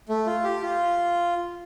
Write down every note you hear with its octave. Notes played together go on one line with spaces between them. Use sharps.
A3
F4
G4
F4